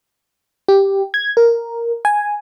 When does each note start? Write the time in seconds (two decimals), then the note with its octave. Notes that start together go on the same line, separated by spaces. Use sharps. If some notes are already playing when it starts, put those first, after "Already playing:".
0.68 G4
1.14 G#6
1.37 A#4
2.05 G#5